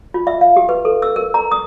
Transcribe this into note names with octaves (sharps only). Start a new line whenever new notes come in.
F4
E5
F5
G4
B4
A4
E6
A#4
A#5
D#6